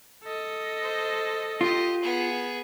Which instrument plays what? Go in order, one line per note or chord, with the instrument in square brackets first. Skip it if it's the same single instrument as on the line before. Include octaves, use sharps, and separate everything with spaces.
[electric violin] A4 D#5
[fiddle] C5
[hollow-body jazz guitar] F4 [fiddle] G4 D#6
[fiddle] B3 G#4